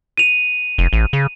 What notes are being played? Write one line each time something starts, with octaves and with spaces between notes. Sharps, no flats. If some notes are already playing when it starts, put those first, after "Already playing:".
D#7 F7
F1
A1
C#3